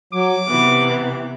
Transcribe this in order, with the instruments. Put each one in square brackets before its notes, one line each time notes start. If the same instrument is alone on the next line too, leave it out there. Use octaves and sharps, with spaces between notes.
[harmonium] F#3 [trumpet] D6
[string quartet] C3 E3 [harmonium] B3